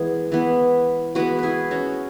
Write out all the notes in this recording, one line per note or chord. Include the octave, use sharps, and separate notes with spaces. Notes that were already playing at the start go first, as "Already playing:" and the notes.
Already playing: E3 G#3 B3 G#4
E3 B3
E3 G#3 B3 F#4 B4
E4 G#4 B4
C#4 F#4